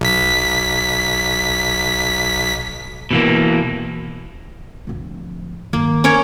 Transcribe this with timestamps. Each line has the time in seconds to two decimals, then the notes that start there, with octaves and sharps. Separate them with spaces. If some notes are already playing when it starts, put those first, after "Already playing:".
0.01 B1 B6
3.11 B2 E3 A#3
4.87 D1 F3
5.73 G2 D#3 A#3
6.04 C#4 A#4 C#5